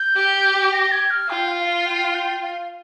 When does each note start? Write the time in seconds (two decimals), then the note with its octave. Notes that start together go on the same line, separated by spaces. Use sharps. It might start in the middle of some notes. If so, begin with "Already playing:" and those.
Already playing: G6
0.16 G4
0.73 A#6
0.92 G#6
1.10 F6
1.29 F4 G5
1.48 F5
1.67 F5
1.86 G5
2.04 F5
2.15 G5
2.42 F5